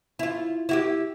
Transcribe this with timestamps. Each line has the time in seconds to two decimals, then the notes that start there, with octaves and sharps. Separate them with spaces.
0.19 E4 F4
0.69 E4 F#4 G4